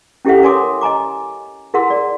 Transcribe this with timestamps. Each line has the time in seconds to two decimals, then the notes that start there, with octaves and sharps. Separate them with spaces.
0.25 C#4 E4 G4 A4 E5 F#5
0.43 A#4 C#5 G#5 C6 D6 D#6
0.81 D#5 G#5 A#5 D6
1.74 E4 G#4 A#4 F#5 C6 E6
1.90 D5